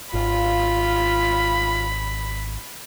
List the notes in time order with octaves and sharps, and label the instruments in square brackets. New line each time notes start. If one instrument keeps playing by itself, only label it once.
[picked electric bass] G#1 [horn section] F4 [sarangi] B5